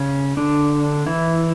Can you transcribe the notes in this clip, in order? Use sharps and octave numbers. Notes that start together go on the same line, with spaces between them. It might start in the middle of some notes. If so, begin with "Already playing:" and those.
Already playing: C#3 C#4
D3 D4
E3 E4